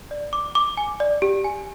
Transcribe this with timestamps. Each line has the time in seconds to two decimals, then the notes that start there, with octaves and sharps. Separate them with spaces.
0.11 D5
0.33 D6
0.55 D6
0.77 G#5
1.00 D5
1.22 G4
1.44 G#5